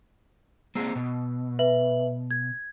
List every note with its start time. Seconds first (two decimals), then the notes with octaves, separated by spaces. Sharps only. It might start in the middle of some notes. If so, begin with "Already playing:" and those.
0.75 A#3 C4 G#4 E6
0.96 B2
1.59 B4 E5 F#7
2.31 G#6